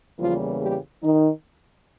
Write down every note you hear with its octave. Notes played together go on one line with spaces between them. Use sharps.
E2 C#3 E3 F3 G3 A#3 F4
G3 G4
D#3 D#4